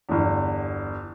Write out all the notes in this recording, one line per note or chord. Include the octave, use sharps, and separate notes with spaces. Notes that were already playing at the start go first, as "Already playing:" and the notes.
G1 E2